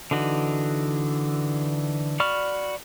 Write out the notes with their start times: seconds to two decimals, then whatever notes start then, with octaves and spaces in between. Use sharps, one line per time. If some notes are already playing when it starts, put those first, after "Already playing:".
0.11 D3 E3 D#4 F#4
2.20 F#4 D5 B5 C#6 F6